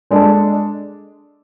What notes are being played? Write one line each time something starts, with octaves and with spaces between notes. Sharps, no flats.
G#3 D4 A4